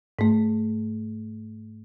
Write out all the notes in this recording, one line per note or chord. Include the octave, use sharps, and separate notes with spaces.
G#2 A3